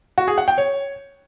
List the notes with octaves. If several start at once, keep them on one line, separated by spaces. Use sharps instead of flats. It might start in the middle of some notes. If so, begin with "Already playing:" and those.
F#4
G#4
F#5
G5
C#5